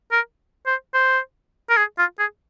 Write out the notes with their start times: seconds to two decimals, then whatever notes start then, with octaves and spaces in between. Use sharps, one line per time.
0.12 A#4
0.66 C5
0.94 C5
1.70 A#4
1.77 G#4
1.98 F4
2.19 G#4